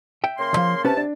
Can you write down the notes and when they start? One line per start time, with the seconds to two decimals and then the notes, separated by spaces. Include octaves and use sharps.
0.24 E5 G5
0.38 C#3 A#3 C6
0.53 D#2 F3
0.85 C3 C#4 B4 A5
0.97 D4